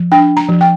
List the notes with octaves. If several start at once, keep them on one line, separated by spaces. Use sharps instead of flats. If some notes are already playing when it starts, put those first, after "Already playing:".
Already playing: F3
D4 G5
A#5
F3
G5